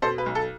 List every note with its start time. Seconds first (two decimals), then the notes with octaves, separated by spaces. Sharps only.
0.02 B2 A4 C5
0.18 B4
0.26 B1
0.35 A4